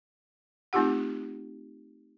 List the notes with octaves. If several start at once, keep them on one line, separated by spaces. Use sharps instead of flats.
A3 C4 D#4 F4 G4 F#5